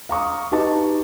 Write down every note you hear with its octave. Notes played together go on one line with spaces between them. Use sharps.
F5 A#5 C#6 D#6
D#4 G4 B4 D#5 A5 C#6